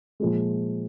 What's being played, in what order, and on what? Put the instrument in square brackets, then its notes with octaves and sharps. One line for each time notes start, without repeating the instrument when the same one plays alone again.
[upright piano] A#2 F3 G#3